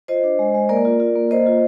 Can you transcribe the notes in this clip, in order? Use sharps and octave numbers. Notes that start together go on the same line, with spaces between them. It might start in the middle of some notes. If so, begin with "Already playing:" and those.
F4 C5 D#5
D4
G#3
G#3
A#3 A#4 D5
F4
F4
A#3
A#3 C5 D#5
F4